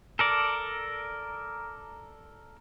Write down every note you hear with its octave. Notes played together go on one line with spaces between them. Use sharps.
A4 A#4 D5